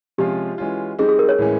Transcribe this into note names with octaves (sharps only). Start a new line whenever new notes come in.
C3 F3 G#3 C#4 F4 G4
E3 G#3 C#4 F4
G3 C4 D#4 G#4
G#4
A#4
C#5
A2 E3 G#3 C#4